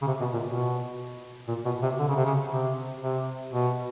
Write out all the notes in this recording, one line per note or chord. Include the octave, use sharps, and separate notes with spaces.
C#3
C3
B2
A#2
B2
A#2
B2
C3
D3
C#3
C3
C#3
C3
C3
B2